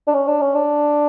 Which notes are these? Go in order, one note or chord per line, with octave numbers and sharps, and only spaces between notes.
D4
C#4
D4
C#4
D4